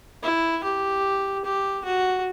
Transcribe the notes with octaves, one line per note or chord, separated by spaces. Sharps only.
E4
G4
G4
F#4